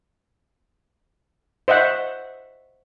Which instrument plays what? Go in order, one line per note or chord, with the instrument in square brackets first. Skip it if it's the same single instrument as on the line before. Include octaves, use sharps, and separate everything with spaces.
[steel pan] C5 D#5 E5 F#5